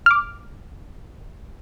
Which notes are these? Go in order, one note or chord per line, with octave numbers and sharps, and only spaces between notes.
D6 F6